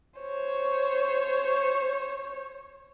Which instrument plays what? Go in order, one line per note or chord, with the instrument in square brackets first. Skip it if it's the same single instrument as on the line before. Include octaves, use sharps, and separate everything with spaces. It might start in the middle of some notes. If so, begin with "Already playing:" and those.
[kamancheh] C5 C#5